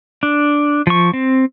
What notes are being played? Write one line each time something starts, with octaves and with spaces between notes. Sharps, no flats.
D4
F3 C#6
C4